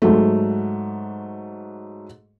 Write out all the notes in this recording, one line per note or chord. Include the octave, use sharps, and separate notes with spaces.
G#2 F#3 A3